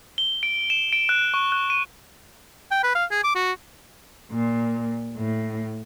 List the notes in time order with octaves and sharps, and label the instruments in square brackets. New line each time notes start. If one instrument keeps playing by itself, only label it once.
[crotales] G7
D7
E7
D7
F#6
C#6
F#6
D#7
[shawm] G5
B4
F5
G#4
D6
F#4
[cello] A#2
A2